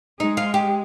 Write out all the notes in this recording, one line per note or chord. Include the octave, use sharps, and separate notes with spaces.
G#3 D#4
F4
G4